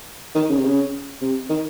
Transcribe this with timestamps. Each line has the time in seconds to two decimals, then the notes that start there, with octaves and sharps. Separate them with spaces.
0.35 D#3
0.50 C#3
0.57 C3
0.64 C#3
1.21 C3
1.49 D#3